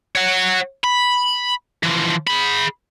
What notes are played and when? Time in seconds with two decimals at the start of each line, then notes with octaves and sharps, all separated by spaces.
0.15 C#5 F#5
0.84 B5
1.83 E3 F3
2.27 G#4 B5